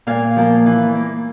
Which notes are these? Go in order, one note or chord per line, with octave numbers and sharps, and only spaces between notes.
A#2 F5 G#5
F3 A#3
E3
A#3